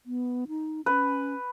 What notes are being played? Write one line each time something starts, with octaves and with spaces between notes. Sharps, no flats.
B3
D#4
C#4 B4